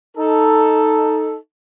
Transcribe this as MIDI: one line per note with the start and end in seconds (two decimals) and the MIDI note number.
0.17 1.36 63
0.17 1.36 69